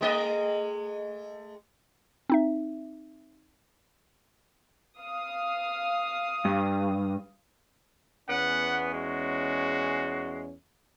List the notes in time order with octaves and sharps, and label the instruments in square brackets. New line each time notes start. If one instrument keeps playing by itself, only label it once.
[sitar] G#3 A3 D#5
[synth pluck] C4 D#4 E5
[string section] F5 D#6
[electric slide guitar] G2
[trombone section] E2 C#4 [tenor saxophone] B3 [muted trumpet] F#5
[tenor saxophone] G#3 [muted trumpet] F#4